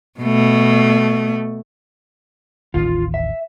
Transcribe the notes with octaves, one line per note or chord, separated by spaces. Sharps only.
B2 A3
D#1 A1 D#3 F4
E5